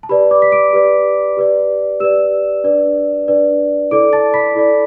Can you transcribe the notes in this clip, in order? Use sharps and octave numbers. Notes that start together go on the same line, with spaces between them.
A5
G4 B4 D5 B5
D5 D6
B6
D6 D7
G4 B4 D5
G4 B4 D5
G4 B4 D5 E6 E7
D4 B4 D5
D4 B4 D5
E4 A4 D5 D6 D7
A5 A6
B5 B6
E4 A4 D5